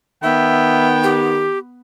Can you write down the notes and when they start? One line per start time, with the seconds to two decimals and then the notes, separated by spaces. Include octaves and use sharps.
0.23 D#3 B3 E5 G5
1.04 G4